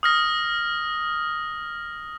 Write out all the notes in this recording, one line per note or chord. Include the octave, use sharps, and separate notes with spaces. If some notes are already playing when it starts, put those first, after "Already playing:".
D#6 F6 A#6